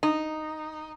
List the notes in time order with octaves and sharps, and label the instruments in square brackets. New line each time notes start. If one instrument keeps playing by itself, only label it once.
[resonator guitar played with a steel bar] D#4